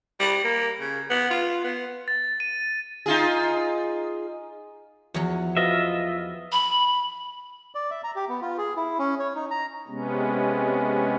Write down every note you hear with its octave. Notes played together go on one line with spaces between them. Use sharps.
G3
A#3
C#3
B3
F4
B3
A6
D#7
D#4 F4 G#4
E2 F3 F#3 F#4
F4 F#4 B4 C5 D#5 E5
B5
D5
E5
A#5
G4
B3
F4
G#4
E4
C#4
C#5
D#4
A#5
C3 G#3 B3 C#4